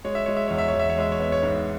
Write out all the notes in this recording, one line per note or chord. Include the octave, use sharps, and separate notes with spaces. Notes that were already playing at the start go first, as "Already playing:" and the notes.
G#3 C#5
E5
G#3 C#5
E5
E2 C#5
E5
C#5
E2
E5
C#5
G#3 E5
C#5
B3 E5
C#5
G#2